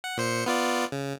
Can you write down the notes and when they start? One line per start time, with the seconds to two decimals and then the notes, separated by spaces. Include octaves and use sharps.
0.04 F#5
0.17 A#2 C5 C#7
0.46 B3 F4 D5
0.92 C#3